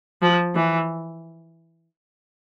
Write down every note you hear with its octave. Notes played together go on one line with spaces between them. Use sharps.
F3
E3